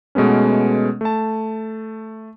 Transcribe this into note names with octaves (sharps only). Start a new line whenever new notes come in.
B2 G#3 A3 B3 C#4
A3 A5